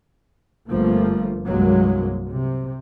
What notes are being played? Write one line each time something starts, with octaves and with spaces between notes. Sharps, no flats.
G1 G2 F3 A3 A#3
C2 G2 F#3 G#3 A#3
C3